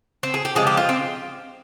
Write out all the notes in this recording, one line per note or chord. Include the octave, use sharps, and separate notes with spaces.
C4
G#4
G4
C3 F3 G#3 G#4
G4
F4
C4